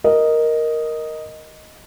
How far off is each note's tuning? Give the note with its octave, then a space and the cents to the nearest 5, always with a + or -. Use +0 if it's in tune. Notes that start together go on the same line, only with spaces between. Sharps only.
A#4 +0 D#5 +0